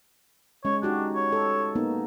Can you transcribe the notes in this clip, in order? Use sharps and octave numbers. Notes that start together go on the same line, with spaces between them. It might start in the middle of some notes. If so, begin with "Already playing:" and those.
G#3 C#4 C#5
D4 D#4 F#4 G4
C#5
A4
A#3 B3 D#4